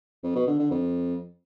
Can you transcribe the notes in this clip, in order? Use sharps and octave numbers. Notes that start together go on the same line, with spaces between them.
F2
B2
D3
D3
F2